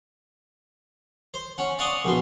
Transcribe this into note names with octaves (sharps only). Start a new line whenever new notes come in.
C5
C#4 F#5
D5 F5 F#5 C6 C#6 D#6
A#1 B2 C6